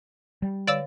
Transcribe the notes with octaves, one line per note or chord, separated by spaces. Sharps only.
G3
D3 C#5 D5 F5 D6 E6